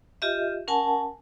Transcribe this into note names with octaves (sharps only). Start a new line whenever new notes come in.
F4 G4 D#5 E5
C#4 A#4 F#5 G#5 A5